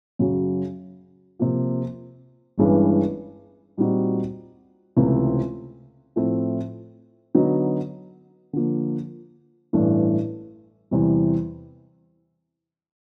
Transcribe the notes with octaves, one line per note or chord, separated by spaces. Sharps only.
F#2 C#3 F#3
C3 F3 A#3
G1 G2 E3 G#3 C#4
A#2 G3 C4 D#4 F#4
C#2 C3 E3 A3 C4
A2 F3 A3 C4 E4
D3 F#3 B3 D#4
D3 F3 A#3
A1 G2 E3 A3 D4
E2 C3 E3 G3